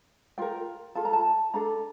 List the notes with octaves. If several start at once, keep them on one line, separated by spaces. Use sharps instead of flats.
F4 A#4 G5
F4 A4 A5
A#5
A5
D4 A4 A#5